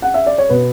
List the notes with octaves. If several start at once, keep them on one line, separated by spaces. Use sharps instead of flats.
F#5
E5
D5
C#5
B2 B3 B4